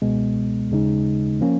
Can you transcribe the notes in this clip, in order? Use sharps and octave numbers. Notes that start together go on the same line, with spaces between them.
C#2 B2 G#3 B3
D#2 C#3 G#3 D#4
F3 A#3 C#4